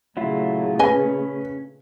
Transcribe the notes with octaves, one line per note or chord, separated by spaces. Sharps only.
A#2 C#3 F#3 A3 E4 F4
C#4 B4 D#5 G#5